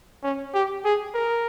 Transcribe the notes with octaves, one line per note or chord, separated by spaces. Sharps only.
C#4
G4
G#4
A#4